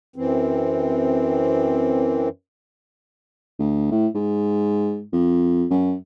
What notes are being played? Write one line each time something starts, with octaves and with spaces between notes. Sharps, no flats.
F#2 E3 C4
D2
A2
G#2
F2
F#2